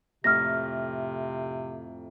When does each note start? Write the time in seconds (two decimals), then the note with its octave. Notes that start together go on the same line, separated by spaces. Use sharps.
0.24 F2 A2 C3 F6 A#6